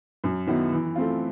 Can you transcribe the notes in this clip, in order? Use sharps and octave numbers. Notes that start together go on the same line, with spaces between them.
F#2
D#3 F#3 B3 E4
E3
A3 C4 F4